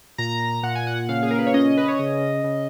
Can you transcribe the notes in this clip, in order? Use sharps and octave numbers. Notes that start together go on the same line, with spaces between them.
A#2 A#5
A#2 F#5
G#5
F#5
C#3 F5
G#4
A#4
B4
C#5
C#4 D#5
B4
C#5
C#3 D#5
C#3